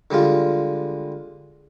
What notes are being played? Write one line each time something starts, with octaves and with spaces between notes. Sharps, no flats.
D3 G3 G#3 F4